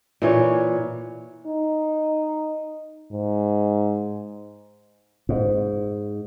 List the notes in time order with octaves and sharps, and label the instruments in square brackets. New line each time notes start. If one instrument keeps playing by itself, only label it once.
[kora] A#2 E3 C#5
[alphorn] D#4
G#2
[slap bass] G#2